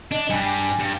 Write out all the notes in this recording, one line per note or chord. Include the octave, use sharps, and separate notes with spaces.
D4 D#5
G2 G3 G#5
G#5
G2